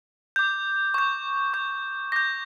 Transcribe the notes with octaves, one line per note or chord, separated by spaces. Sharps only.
D6 G6
C#6 G6
C#6 G6
D6 G6 A#6